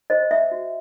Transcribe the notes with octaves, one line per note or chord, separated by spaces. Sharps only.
C5 D#5
E5
F#4